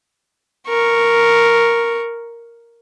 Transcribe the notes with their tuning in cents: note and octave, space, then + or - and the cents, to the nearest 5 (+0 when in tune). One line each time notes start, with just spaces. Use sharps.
A#4 +0 C#6 +0